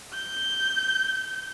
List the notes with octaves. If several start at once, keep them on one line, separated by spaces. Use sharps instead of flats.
G6